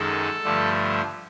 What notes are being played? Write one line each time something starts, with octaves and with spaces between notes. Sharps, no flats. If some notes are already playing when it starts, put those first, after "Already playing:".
Already playing: F#2 D#3 G#3 A4
G2 D3 F3 A3